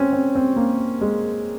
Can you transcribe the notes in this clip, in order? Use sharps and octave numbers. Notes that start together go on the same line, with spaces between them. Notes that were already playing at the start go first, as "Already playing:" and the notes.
Already playing: C4 C#4
C4
C4
A#3
G#3